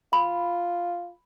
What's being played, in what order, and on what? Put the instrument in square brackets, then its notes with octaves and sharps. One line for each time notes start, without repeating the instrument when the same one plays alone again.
[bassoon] F4 [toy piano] B5